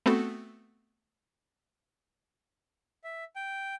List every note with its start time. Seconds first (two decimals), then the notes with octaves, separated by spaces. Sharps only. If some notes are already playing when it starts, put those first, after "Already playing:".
0.06 A3 B3 C4 F#4 A4
3.04 E5
3.36 G5